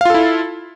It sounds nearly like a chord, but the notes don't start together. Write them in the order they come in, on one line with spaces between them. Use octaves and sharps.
F5 F4 A4 E4